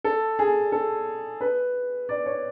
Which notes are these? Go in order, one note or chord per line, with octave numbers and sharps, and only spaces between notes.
A4
G#4
A4
B4
D5
C#5